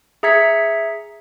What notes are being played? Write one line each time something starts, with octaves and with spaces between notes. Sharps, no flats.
G#4 E5 A#5 G#6 B6 C#7